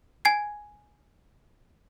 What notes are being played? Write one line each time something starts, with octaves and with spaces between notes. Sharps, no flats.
G#5 G#6 C7